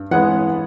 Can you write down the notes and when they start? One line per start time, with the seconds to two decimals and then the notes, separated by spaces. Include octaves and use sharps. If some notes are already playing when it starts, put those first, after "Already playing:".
Already playing: G2
0.11 E3 G#3 B3 F#5